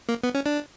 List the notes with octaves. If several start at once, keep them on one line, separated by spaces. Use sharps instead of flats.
A#3
B3
C#4
D4